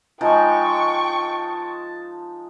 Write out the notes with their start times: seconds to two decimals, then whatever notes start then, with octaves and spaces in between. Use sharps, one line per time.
0.21 F3 G#3 D#4 G5 A5 C#6